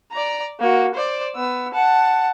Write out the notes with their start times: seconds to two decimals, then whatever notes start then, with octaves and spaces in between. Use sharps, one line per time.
0.12 D5 A#5
0.60 A#3 F#4
0.94 C5 D5
1.35 B3 E6
1.73 F#5 A5